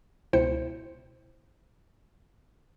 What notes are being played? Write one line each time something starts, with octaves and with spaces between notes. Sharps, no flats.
C#2 B2 E4 C5 G5 C#7